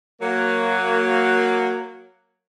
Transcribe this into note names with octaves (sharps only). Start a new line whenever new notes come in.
F#3 A#3